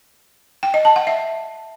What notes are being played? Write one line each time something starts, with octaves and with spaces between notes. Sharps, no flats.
G5
D#5
A5
F#5
E5